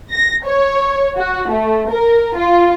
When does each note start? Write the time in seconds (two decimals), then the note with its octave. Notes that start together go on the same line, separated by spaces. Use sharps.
0.12 A#6
0.45 C#5
1.17 F#4
1.49 A3
1.89 A#4
2.36 F4